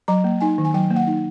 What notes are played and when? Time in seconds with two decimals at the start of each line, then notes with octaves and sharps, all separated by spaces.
0.08 F#3 A#5
0.24 A#3
0.41 D#4 G#5
0.58 D#3
0.65 G#5
0.74 F#3 G5
0.91 A#3
0.96 F#5
1.07 D#4